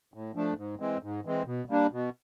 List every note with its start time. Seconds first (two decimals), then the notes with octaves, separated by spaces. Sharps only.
0.14 A2
0.35 F3 A3 D4
0.57 G#2
0.79 E3 G#3 C4
1.03 G#2
1.25 E3 G#3 C4
1.46 B2
1.69 G3 A#3 D4
1.92 B2